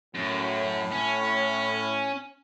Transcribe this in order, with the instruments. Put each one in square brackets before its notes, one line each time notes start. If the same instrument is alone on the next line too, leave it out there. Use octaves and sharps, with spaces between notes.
[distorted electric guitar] F#2 [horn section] A2
[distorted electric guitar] C#4